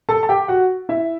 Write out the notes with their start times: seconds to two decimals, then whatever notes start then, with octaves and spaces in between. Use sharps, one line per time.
0.09 A4 A5
0.23 A5
0.29 G4 G5
0.48 F#4 F#5
0.89 E4 E5